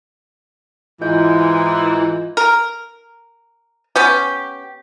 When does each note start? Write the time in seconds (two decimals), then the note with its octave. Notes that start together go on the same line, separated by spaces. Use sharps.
1.01 G#2 E3 F4 D#5 G6
2.37 A#4
3.96 B3 C#4 G4